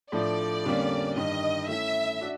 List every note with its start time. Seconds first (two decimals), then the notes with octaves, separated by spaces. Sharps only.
0.12 A2 F3 A3 D4 D5
0.65 F2 D3 G3 A#3 C#4
1.16 G2 D#3 G3 D#5
1.68 A3 C#4 E4 E5
2.21 D4 F#4